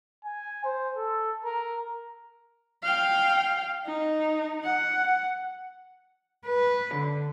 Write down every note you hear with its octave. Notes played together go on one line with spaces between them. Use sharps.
G#5
C5
A4
A#4
F5 G5
D#4
F#5
B4
D3